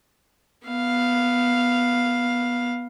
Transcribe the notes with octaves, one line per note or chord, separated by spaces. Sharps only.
B3 F5